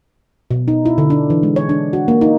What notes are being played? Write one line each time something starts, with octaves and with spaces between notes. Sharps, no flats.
B2
D#4
E4
D3
D4
E3
G#3
C#5
D4
F#4
A#3
D#4